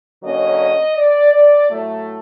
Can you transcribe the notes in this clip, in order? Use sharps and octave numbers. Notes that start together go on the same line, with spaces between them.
D3 F#3 A#3 C#4 D#5
D5
D5
A2 F#3 A3